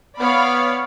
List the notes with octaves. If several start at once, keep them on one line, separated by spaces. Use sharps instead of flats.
B3 C#5 D5 F5 B5